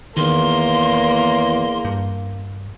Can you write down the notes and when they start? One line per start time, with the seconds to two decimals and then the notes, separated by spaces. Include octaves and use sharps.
0.17 E2 D#3 A#3 C6
1.85 G2